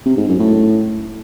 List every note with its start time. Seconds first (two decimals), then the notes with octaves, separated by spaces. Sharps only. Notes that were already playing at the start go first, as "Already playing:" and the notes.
0.06 C3
0.17 G#2
0.28 F#2
0.39 A2